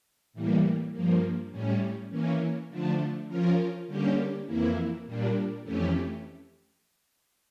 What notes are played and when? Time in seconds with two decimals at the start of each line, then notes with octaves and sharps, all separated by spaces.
0.33 A2 E3 G3 A#3
0.93 G2 F3 A#3
1.51 A2 G3 C#4
2.10 E3 A#3 C#4
2.69 D3 F3 A3 D4
3.28 F3 C#4 F4 A#4
3.87 D3 G3 A#3 C#4 G4
4.46 F2 E3 A#3 E4
5.05 A#2 G3 A#3 D4
5.63 F2 E3 A3 C#4 G4